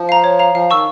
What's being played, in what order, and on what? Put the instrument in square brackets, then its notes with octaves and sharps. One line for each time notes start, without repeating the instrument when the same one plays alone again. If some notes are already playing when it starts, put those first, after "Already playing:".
Already playing: [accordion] F3
[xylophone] F5 A#5
C#5
F5 A#5
[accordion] F3 [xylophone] F5
[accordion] D#3 [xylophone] A5 C#6 E6